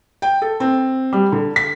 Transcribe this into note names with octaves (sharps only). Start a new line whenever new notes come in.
G5
A4
C4
G3
D3
B6